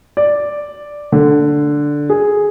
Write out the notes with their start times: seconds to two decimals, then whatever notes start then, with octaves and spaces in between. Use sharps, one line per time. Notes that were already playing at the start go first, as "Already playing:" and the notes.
0.17 D5
1.12 D3
2.10 G#4